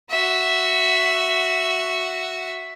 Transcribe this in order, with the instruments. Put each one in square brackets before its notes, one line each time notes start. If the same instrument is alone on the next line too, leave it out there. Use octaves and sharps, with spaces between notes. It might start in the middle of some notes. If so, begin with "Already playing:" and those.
[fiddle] F#4 E5